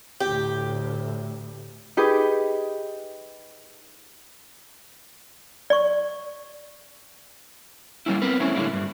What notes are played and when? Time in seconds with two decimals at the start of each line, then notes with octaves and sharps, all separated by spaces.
0.20 D2 A2 G4
1.97 D#4 G4 G#4 B4
5.70 D5 C#6
8.06 G3 A#3 C#4 E4
8.22 B3 C4 A#4 B4
8.40 A3 C4 C#4 E4
8.55 A2 D3 E3 G3 A#3 E4
8.73 G2